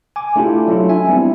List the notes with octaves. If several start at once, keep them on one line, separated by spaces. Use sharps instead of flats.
G#5 D6
A3 D4 E4 F4 G4
F#3 A3 C#4 D4 E4 F4
E5 G#5
G3 B3 C4 D4 E4